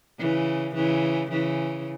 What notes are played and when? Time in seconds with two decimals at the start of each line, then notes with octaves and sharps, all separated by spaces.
0.19 C#3 E3
0.75 C#3 E3
1.31 C#3 E3